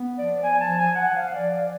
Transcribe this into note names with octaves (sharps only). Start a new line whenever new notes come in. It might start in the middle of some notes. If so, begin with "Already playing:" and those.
Already playing: B3
F3 D5
F3 G#5
A5
F3
G#5
F3
F#5
F3 F5
D5
F3
D5